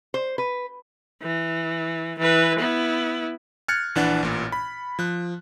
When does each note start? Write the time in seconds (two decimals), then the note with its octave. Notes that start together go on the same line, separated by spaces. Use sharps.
0.14 C5
0.38 B4
1.22 E3
2.19 E3 B4
2.59 B3 E4
3.68 F6 F#6 G#6 A6 C#7
3.95 A#1 E3 D4 F#5 A6
4.23 A1 A#2
4.52 B5
4.99 F3 F#6